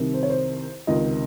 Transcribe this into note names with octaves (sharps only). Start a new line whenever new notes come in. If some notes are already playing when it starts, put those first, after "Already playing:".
Already playing: C2 C3 D#3
C5
C#5
C5
C#2 C3 D#3 D#5